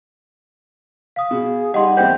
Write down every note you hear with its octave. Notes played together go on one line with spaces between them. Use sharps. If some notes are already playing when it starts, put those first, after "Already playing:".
F5 D#6
B2 G#4
G3 D#4 G4 G#4 D#5 F#5 C6
E2 C4 E4 C5 G5 G6